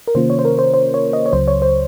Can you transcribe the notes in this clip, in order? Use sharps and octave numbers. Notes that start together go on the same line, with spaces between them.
A#4
C3 D#3 A#3 C#4 F4 C5
C#5
C5
A#4
C5
C5
C#5
D#5
C#5
C#2 C#3 F#3 C5
C#5
C5